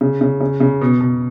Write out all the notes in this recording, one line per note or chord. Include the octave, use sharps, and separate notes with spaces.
C#3
C#3
C#3
C#3
B2
B2